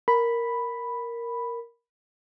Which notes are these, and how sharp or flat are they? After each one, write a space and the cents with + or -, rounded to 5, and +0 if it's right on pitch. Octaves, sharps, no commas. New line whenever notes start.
A#4 +0 B5 +0